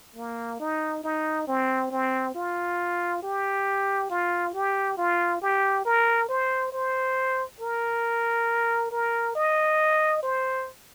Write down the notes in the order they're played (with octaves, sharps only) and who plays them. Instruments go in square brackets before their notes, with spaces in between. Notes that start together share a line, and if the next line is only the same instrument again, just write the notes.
[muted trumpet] A#3
D#4
D#4
C4
C4
F4
G4
F4
G4
F4
G4
A#4
C5
C5
A#4
A#4
D#5
C5